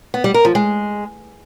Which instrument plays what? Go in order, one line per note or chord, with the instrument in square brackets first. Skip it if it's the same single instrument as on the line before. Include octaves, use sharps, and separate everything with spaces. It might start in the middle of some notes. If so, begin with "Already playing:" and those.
[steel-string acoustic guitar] B3
G3
A#4
F3
G#3